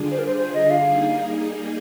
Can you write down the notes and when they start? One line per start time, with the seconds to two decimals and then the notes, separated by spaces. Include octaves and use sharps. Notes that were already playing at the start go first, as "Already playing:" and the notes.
Already playing: D3 G3 D4 F4 G#4
0.11 C5
0.19 A#4
0.26 C5
0.37 C5
0.54 D#5
0.70 F5
0.88 G3 A#3 D#4 G#4